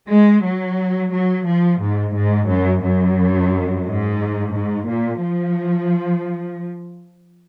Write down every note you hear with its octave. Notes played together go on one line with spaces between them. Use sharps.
G#3
F#3
F#3
F3
G#2
G#2
F#2
F#2
G#2
G#2
A#2
F3